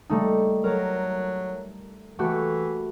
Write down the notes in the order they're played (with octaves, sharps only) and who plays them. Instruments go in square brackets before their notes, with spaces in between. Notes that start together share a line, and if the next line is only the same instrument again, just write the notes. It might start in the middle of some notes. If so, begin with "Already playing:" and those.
[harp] G3 A3 D#4
[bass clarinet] F#3 [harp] A#4
[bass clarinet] E3 [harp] A3 F#4 G4